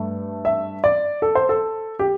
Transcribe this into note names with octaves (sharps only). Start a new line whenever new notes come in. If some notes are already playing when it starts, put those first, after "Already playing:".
Already playing: G2 A3
E5
D5
A4
C5
A4
G4